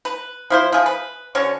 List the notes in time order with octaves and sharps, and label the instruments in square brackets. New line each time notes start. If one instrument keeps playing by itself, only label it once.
[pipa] B4
F3 E4 C5
F3 G#4
B4
D3 C#4 F#4 C#5